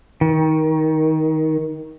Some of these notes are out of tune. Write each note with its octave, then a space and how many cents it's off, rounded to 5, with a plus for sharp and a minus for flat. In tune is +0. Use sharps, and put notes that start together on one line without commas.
D#3 +20